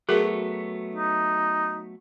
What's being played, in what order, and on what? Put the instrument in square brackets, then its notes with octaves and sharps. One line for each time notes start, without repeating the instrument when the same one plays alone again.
[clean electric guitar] F#3 A3 B3 [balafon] F#4 G#4 A#4
[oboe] D#4